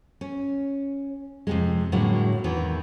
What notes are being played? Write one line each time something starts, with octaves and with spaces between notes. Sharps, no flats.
C#4
F2 C3 G#3
A2 D3 F#3 G#3 A#3
E2 D#3 E3